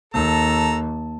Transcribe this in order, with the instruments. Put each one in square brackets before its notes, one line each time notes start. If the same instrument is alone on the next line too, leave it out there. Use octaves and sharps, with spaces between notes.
[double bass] D#2 [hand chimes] A#3 A5 [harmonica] A4 A#5